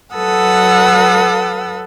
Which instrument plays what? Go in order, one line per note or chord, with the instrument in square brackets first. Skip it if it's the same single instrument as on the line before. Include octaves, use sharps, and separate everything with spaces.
[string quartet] F#3 A4 B4 F#5 D#6 E6